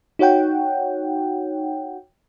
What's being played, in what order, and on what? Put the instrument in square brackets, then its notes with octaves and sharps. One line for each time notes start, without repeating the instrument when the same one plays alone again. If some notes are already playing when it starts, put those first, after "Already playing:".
[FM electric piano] D#4 F#4 C#5 F#5 G5